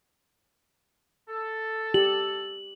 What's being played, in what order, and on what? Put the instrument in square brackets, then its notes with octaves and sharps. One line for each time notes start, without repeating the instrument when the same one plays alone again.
[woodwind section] A4
[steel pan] G4 [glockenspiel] F#7